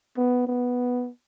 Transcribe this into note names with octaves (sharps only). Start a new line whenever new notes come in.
B3
B3